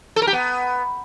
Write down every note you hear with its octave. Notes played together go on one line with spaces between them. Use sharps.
A4
A#4
G4
B3